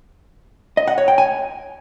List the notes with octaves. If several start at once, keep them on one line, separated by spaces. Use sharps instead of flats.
D#5
F#5
C#5
G5
G#5